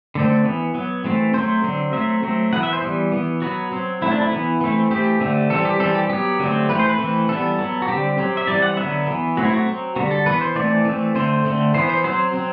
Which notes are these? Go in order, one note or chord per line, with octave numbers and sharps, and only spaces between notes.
D3 A3 C4
E3 B3
F#3 B3
E3 A3 C4
F#3 A3 C4 C5
D3 F#3 C4
F#3 A3 C4 E5
F#3 A3 C4
E3 B3 F#5
E5
C5
E3 G3 B3
E3 B3
F#3 B3 F#4
F#3 C4
F#3 A3 C4 E4
D4
E4
E3 B3
E3 A3 C4
E3 A3 C4 G4
D3 A3 C4
E3 G3 C4 A4
G4
E3 G3 C4 A4
G4
F#3 B3 G4
D3 F#3 A3 C4
E3 A3 C4 B4
C5
B4
E3 A3 C4
E3 G3 B3 A4
F#3 B3
F#4
D3 G3 C4 G4
F#3 C4
E5
E3 G3 C4 D5
F#5
D3 F#3 B3 E5
E3 B3
F#3 A3 C4 F#4
E4
F#4
F#3 C4
D3 G3 B3 F#4
A4
E3 B3 B4
C5
E3 A3 C4 D5
E3 A3 C4
D3 A3 C4 C5
D3 A3 C4
E3 B3 C5
C5
F#3 C4 C5
F#3 C4